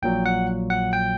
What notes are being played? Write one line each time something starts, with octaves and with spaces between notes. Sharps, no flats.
A#1 A#2 F#3 G5
F#5
F#5
G5